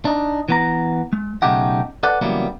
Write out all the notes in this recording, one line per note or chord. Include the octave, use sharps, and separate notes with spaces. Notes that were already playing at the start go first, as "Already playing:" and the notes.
D4 D#4
E3 B3 A#5
G#3
B1 C#3 A3 D#4 G4 F#5
A4 B4 D5 F#5
C#3 E3 F#3 G3 A#3 B3